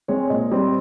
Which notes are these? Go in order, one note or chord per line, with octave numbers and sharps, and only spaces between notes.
G#3 C4 C#5
A#2 D#5
G3 C4